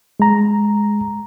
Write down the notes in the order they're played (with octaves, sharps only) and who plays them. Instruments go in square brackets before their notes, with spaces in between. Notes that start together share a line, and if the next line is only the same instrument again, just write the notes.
[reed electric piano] G#3 A#5